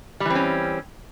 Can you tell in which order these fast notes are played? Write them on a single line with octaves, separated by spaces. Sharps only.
G3 E3 C4 C#4